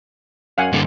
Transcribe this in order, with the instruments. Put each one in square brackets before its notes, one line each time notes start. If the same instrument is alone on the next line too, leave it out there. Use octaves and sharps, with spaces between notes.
[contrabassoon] F#2 [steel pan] F5 F#5 G#5
[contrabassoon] D#1 [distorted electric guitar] G2 D3